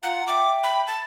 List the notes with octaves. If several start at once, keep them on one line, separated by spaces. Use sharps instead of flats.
F4 F5 F#5 A#5
E5 G5 D6
B5
A5